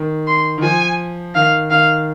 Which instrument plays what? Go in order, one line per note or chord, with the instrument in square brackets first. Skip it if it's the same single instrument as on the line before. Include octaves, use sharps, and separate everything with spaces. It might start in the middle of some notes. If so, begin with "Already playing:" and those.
Already playing: [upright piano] D#3
[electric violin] C6
[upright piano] D#3
[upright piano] F3 [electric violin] G#5
[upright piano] D#3 [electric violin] F5
[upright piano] D#3 [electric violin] F5